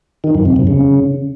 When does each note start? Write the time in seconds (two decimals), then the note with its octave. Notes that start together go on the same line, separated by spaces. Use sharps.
0.24 D#3
0.35 F#2
0.45 C3
0.56 F#2
0.67 C#3